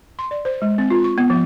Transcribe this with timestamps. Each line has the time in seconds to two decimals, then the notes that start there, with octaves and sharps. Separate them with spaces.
0.19 C6
0.31 D5
0.45 C5
0.62 G#3
0.78 C4
0.90 F4
1.04 C#6
1.18 B3
1.30 F3